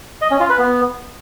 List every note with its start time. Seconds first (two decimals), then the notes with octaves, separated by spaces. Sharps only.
0.21 D#5
0.31 C#4
0.40 F4
0.50 B4
0.59 B3